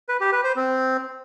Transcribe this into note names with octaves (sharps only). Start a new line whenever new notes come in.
B4
G4
B4
C5
C4